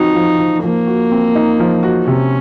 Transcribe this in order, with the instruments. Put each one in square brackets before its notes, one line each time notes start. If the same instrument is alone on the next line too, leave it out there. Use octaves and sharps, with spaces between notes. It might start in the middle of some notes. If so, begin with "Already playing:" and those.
Already playing: [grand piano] F3 C4 F#4 [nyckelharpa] D#4
[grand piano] F3
F3
[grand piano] F3 [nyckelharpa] A#3
[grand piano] F#4
C4
D#4
F3
F#4
[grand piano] C3 [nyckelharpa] C#4